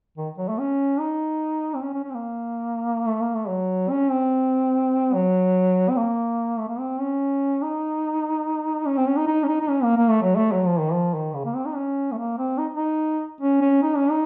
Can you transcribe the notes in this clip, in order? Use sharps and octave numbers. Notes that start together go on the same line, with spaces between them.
D#3
F#3
A3
C#4
D#4
C4
C#4
C#4
C#4
C4
A#3
A3
A#3
A3
F#3
C#4
C4
F#3
C4
A#3
A3
A#3
C4
C#4
D#4
C#4
C4
C#4
D#4
D#4
C#4
D#4
D#4
C#4
A#3
A#3
A3
F#3
A3
F#3
F3
D#3
F3
D#3
C#3
A#3
C4
D#4
C#4
A3
A#3
C4
D#4
D#4
C#4
C#4
D#4
C#4
D#4